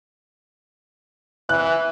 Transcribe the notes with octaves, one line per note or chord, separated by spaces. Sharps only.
E3 F#6